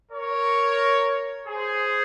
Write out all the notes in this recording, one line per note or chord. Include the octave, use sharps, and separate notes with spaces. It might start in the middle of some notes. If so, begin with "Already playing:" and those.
A#4 C#5
G#4 C5